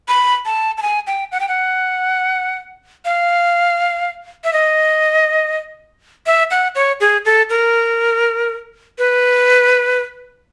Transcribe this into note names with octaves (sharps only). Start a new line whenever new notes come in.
B5
A5
A5
G#5
G5
F#5
G5
F#5
F5
E5
D#5
E5
F#5
C#5
G#4
A4
A#4
B4